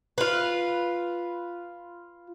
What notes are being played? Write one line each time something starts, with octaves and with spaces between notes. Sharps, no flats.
F4 B4